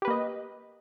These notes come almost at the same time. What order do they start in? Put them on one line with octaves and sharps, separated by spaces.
G4 B4 A#3 D#5